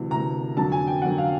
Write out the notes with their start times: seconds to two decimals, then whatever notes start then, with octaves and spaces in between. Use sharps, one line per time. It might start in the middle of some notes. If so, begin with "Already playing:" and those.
Already playing: D2 C3 E3
0.11 D2 C3 E3 A#5
0.57 F2 D3 F#3 A5
0.72 G#5
0.87 G5
1.02 F2 D3 F#3 F#5
1.18 F5